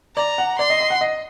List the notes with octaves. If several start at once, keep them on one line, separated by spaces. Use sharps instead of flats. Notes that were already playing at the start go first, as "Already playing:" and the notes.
D5 A#5
F#5
D5 C6
D#5
D#5
F#5
D#5